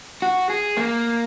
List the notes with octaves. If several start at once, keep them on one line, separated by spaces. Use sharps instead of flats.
F#4
G#4
A#3